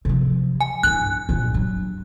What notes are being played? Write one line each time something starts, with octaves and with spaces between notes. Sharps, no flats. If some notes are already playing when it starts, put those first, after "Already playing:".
C3 F3
G#5
G2 E4 F#6
G2 A#2
F#3